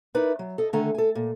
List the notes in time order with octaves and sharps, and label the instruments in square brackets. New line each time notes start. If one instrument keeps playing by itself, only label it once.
[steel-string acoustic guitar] D#4 E4 A#4 B4 D5
F#3
A4 D#5
D3 D#3 A3 A4 G#5 A#5
A4 G#5
A#2